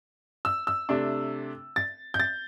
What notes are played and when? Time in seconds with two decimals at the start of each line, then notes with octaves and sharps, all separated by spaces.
0.45 E6
0.67 E6
0.89 C3 A3 D4
1.76 A6
2.14 G6
2.20 A6